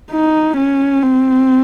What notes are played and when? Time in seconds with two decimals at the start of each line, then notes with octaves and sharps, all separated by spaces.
0.11 D#4
0.57 C#4
1.03 C4